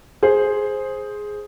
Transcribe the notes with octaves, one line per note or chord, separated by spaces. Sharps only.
G#4 C5